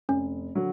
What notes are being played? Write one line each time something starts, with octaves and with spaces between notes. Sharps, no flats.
F1 C#4
D3 F#3